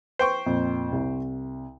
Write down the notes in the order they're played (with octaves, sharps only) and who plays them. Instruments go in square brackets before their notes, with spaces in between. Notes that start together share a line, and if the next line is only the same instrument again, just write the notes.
[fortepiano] C5 G5 C#6
[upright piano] F2 A#2
C2